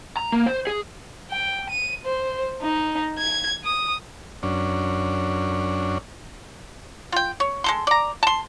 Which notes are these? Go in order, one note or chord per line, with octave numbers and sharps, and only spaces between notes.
A#5
A#3
C5
G#4
G5
D#7
C5
D#4
G#6
D#6
F#2 C#4 D4
F4 G5
C#5
G#3 A4 C6
D5 A#5
A5 C6